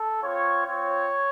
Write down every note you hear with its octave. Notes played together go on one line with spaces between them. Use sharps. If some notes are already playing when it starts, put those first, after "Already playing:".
Already playing: A4
C4 F4 C#5
C4 F4 C#5